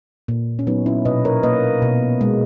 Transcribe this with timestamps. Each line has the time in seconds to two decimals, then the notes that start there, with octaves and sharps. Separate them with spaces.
0.28 A#2
0.59 C#4
0.67 F#3 B3 D#4
0.86 C#4 E4
1.05 B2 B4 D#5
1.25 A#4 C#5
1.43 A#3 B4 D#5
1.82 B2
2.21 G#3